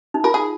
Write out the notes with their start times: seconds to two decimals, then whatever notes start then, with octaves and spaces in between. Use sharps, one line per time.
0.14 D#4
0.24 F4 A#4
0.34 G#4